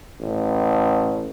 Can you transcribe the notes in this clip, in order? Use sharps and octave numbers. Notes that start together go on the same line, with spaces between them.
A1